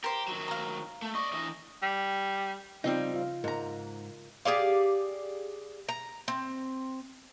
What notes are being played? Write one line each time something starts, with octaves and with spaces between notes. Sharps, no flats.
G4 A#4 C5
D#3 F#3
F5 A#5
A3
D5 D#5 C#6
E3 D#5
G3
C#3 G3 C4 D#4 F4
F4 F5
G#2 A#4 A#5
G4 G#4 D5 F5
A#5
C4